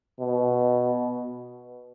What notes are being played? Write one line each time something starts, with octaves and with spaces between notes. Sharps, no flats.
B2